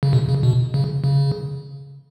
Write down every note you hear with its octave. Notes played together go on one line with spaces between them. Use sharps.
C#3
B2
C#3
B2
C#3
C#3